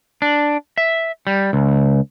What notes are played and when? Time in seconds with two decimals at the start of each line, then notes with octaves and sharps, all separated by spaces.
0.22 D4
0.78 E5
1.27 G3
1.53 C#2